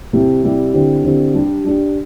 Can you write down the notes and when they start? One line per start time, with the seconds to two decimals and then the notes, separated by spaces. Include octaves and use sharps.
0.13 C3 G3 E4 G4
0.43 C3 G3 E4 G4
0.74 D3 C4 E4 G4
1.04 D3 C4 E4 G4
1.34 G3 D4 G4
1.64 G3 D4 G4